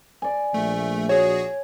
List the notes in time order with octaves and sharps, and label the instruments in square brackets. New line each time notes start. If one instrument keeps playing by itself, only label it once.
[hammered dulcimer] D5 G#5
[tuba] A#1 [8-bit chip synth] A3
[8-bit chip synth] F#4 G#4 [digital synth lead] C#5